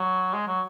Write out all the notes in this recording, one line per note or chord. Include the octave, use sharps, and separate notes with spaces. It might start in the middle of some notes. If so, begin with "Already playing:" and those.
Already playing: F#3
G#3
F#3